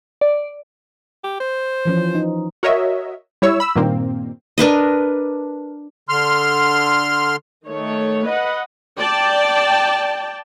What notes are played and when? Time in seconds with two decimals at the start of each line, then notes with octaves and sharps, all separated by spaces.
0.21 D5
1.24 G4
1.40 C5
1.85 E3 F3 C#4
2.15 D#4
2.63 F#4 A#4 C#5 D#5 E5
3.42 G3 E4 C#5 E6
3.60 B5 E6
3.75 G2 A#2 D#3 A#3 C4
4.58 D4 A#4 B4 D#5
6.09 D3 C6 F6
7.68 D#3 A3 C#5
8.28 B4 D#5 F#5
8.99 D5 G5 A5